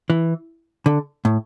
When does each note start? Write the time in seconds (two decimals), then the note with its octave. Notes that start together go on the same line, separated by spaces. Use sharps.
0.10 E3
0.86 D3
1.25 A2